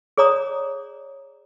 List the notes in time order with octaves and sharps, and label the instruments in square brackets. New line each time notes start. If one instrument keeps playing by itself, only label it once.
[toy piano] G#4 C#5 D5 A#5 D#6